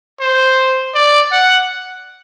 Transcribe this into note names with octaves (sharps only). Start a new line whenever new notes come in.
C5
D5
F#5